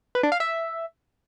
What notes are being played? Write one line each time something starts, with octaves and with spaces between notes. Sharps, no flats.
B4
D4
F5
E5